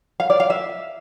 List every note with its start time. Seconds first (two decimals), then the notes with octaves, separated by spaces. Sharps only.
0.20 F5
0.30 D5
0.40 F5
0.50 E5